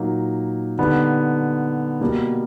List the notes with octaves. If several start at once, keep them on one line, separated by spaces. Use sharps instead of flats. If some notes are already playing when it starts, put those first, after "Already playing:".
Already playing: A#2 F#3 A#3 D#4
D3 G3 B3 D#4
B2 G3 A#3